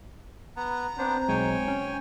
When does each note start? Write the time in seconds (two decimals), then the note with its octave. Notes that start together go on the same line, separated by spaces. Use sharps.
0.57 B3 A#5
0.98 B3 C4 D4 C5
1.29 B1 G#3 C#5 G5 G#5
1.68 C#4